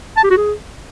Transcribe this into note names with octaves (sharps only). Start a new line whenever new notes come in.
A5
G4
F#4
G#4